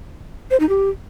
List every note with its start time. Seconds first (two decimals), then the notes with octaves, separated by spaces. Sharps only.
0.51 C5
0.60 D#4
0.69 G4